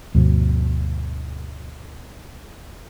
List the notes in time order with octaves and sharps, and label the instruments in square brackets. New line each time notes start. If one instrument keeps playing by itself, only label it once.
[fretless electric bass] D2 G2 B2 F3